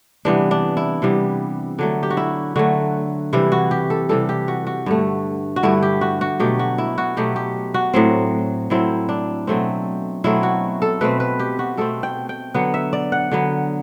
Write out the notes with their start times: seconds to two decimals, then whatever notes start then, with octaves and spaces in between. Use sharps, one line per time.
0.25 C3 E3 G3 B3 D4
0.51 D4
0.77 E4
1.02 C3 E3 G3 B3
1.78 D3 F#3 A3 D4
2.03 G4
2.10 F#4
2.17 E4
2.56 D3 F#3 A3 F#4
3.33 C3 E3 G3 E4
3.52 F#4
3.71 G4
3.90 A4
4.09 C3 E3 G3 A4
4.29 G4
4.48 F#4
4.67 F#4
4.86 G2 D3 A3
5.56 F#4
5.63 G2 D3 A3 E4
5.82 G4
6.01 F#4
6.21 F#4
6.39 B2 F#3 A3 G4
6.59 F#4
6.78 E4
6.98 F#4
7.17 B2 F#3 A3 G4
7.36 G4
7.74 F#4
7.94 A2 F#3 C4
8.70 A2 F#3 C4 E4
9.09 D4
9.47 B2 F#3 A3 C4
10.24 B2 F#3 A3 C4 E4
10.43 F#4
10.82 A4
11.01 B2 A3 C4 B4
11.20 B4
11.39 G4
11.59 F#4
11.77 B2 A3 C4 A4
12.03 G5
12.29 G5
12.54 D3 F#3 B3 F#5
12.74 E5
12.93 D5
13.12 F#5
13.31 D3 F#3 B3